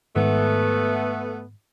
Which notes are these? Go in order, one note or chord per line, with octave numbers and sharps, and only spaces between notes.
G#2 D#3 A3 B3